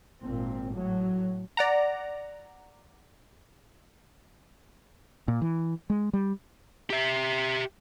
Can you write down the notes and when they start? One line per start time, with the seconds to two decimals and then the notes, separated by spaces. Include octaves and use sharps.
0.21 G#1 A#2 C4
0.73 A2 F#3
1.57 D5 F#5 A#5
5.28 A#2
5.42 E3
5.90 G#3
6.13 G3
6.90 G4 E5